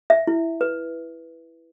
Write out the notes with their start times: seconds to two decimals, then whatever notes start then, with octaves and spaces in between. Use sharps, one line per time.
0.10 E5
0.27 E4
0.61 B4